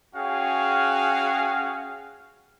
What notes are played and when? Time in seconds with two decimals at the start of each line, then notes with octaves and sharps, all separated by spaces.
0.16 C#4 F#4 G#4 F5 G5